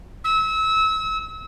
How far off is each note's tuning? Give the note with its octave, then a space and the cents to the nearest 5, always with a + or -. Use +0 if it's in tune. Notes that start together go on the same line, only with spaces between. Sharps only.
E6 -30